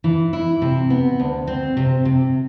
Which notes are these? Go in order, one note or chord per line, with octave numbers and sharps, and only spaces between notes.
E3
E4
C3
B3
D2
C4
C3
C3